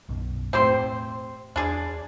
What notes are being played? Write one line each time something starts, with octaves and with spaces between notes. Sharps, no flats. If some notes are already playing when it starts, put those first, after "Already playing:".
B1 F#2 B2
E1 A2 A3 C4 G4 C5
E2 D4 G#4 D5